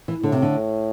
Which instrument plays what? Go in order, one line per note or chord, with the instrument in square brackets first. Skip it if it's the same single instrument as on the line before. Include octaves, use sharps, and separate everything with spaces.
[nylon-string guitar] E3
[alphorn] A2 [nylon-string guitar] D3
[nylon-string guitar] C3
D3